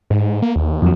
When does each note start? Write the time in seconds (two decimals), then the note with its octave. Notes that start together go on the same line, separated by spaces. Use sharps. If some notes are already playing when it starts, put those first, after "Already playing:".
0.10 G#2
0.42 A#3
0.56 D#2
0.82 F2 F#3